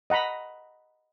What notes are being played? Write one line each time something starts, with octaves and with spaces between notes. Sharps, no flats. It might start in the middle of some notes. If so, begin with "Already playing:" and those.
D#5 F#5 A#5 B5